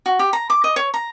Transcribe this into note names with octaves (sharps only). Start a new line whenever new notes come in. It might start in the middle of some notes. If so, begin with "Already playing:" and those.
F#4
G4
A#5
D6
D#5
C#5
A#5